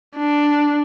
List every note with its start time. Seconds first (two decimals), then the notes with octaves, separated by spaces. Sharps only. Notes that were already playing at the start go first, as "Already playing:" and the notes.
0.16 D4